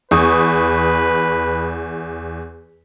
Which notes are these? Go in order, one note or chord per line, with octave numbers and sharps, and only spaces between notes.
E2 B4 C#6 D#6